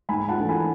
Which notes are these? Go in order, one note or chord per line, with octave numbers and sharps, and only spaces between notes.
G#2 G#5 B5
F#5 A5
E3 A3 D4
G#5 B5